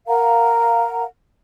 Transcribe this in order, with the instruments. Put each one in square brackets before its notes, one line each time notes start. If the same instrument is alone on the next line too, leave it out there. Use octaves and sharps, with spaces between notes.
[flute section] A#4 F5 F#5 A#5